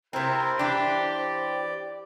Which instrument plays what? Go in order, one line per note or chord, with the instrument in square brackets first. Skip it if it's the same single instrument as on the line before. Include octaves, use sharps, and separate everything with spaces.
[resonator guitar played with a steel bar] C3 C4 [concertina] E4 A#4 G5 [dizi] C5
[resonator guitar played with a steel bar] E3 D4 [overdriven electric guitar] G4 [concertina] D5